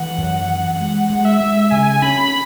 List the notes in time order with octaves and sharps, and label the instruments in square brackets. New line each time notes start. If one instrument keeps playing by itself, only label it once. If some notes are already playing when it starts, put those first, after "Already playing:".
Already playing: [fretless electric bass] E3 [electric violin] F#5
[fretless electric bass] F#2
E3
[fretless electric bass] G#3 [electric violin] F#5
[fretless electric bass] G#3
[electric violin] E5
[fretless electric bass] G#3
[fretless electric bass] C#3 [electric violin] G#5
[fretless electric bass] C#4 [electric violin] B5